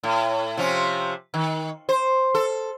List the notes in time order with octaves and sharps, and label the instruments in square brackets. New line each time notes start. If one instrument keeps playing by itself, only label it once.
[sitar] A2
C3 F3 C#4
D#3
C5
A4